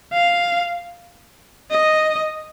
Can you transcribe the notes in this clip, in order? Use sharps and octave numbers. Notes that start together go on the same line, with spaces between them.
F5
D#5